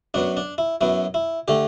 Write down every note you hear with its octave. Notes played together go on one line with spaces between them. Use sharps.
F#2 F#3 B3 D4
D4
E4
F#2 F#3 B3 E4
E4
D3 A3 G4